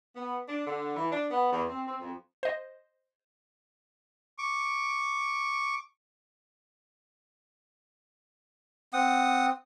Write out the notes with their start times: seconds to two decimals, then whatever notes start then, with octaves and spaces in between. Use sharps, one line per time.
0.16 B3
0.49 D4
0.66 D3
0.97 E3
1.12 D4
1.31 B3
1.53 E2
1.69 C4
1.87 C4
2.01 F2
2.43 C5 D#5
4.38 C#6 D6
8.93 C4 F#5 D#6